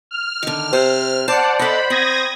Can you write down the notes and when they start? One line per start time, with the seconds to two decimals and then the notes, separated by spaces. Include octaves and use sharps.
0.11 F6
0.43 D3 D#3
0.73 C3 C5
1.28 C5 D5 F#5 A5
1.59 A4 D#5 B5
1.90 C4 D#6 G#6 A#6